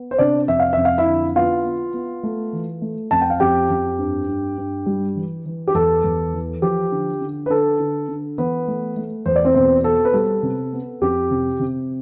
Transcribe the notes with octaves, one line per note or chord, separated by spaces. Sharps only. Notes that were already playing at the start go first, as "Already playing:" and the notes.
Already playing: B3
C5
C3 D4 D5
F2 E5
F5
F2 E5
F5
E4 E5
D3
B3 F4 F5
B3
B3
A3
E3
A3
F2 A5
G5
F5
F2 G4 G5
F2
G2
G2
G2
G3
E3
E3
G4
E2 A4
E2
E3
F3 G4
D3
D3
B4
D3 A4
D3
D3
E3 B3 B4
A3
A3
E2 C5
D5
C4 C5
B2 C4 C5
B3 A4
B4
G3 A4
C3
B3
F2 G4
C3
C3